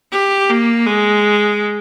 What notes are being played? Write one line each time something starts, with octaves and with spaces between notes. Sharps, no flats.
G4
A#3
G#3